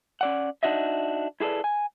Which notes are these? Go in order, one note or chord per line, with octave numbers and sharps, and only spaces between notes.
C#4 D5 F#5
D4 D#4 F#4 D#5 E5
E4 G#4 A4 B4 D5
G#5